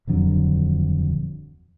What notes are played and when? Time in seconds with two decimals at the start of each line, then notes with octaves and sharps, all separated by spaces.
0.07 D#1 F2 D3 F#3